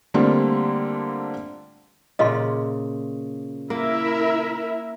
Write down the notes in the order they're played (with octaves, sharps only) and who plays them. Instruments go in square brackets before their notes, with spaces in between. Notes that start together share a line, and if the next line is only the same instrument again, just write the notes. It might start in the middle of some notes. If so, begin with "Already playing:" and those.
[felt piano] D3 G3 A3 A#3 C4 F4
[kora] A#2 C#3 [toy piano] D#5 F5 C6
[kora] A#3 [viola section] E4 A#4 E5